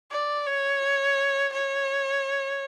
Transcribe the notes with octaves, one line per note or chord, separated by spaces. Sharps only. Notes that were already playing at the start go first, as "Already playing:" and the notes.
D5
C#5
C#5